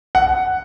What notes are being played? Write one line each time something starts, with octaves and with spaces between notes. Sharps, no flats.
F#5